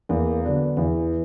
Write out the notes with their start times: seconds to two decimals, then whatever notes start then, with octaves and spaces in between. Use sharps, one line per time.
0.09 E2 A#3
0.43 D3 F#3 B3 D4
0.77 E2 E3